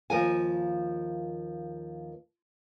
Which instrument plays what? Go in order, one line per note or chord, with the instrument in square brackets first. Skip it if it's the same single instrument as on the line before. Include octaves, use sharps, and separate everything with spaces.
[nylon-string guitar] D#2 F3 A#4 G#5